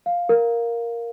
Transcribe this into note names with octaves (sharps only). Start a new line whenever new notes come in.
F5
A#4